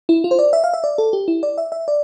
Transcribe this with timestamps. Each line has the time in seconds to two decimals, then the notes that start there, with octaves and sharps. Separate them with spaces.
0.09 E4
0.24 F4
0.31 C5
0.39 D5
0.53 E5
0.64 F5
0.73 E5
0.84 D5
0.98 A4
1.13 G4
1.28 E4
1.43 D5
1.58 E5
1.72 E5
1.88 D5